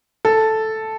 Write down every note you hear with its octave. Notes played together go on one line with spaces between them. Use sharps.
A4